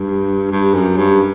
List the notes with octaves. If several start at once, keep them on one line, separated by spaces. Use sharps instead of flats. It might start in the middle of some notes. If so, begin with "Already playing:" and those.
Already playing: G2
G2
F#2
G2